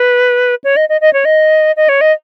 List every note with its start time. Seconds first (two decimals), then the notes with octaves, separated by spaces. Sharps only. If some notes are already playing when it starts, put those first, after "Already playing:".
Already playing: B4
0.64 C#5
0.76 D#5
0.89 D#5
1.01 D#5
1.13 C#5
1.25 D#5
1.76 D#5
1.89 C#5
2.01 D#5